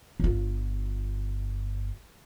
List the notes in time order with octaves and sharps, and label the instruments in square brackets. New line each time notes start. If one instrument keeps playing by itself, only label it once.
[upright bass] G1 F4